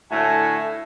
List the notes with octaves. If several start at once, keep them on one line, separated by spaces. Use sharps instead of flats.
A2 D3 F#4 E5 G#5 A5